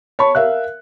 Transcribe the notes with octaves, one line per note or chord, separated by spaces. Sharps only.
C#5 A5 B5 C#6
A#4 E5 F5 F#6